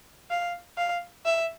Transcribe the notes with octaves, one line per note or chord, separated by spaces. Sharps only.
F5
F5
E5